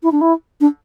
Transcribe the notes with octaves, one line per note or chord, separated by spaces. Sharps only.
E4
D4
E4
D4